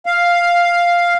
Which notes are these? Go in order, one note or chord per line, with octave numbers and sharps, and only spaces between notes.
F5